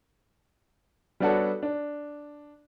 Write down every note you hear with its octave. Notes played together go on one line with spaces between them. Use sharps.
G3 B3 D4 F#4 A4 C#5
D4